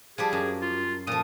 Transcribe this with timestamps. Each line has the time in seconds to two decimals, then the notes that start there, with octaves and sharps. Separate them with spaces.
0.18 F3 G3 G4 G#4
0.33 F#2
0.62 F4
1.07 A#2 F3 D#6